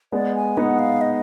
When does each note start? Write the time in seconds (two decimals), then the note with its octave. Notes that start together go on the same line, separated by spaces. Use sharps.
0.12 G#3 B3 D5
0.35 G#5
0.57 B3 D#4 F#5
0.79 F5
1.01 D#5